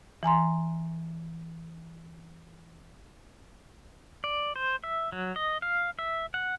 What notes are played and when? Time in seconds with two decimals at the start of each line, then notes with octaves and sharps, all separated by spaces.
0.23 E3 G#5 A#5 C6
4.24 D5
4.56 C5
4.84 E5
5.12 F#3
5.36 D#5
5.62 F5
5.99 E5
6.34 F#5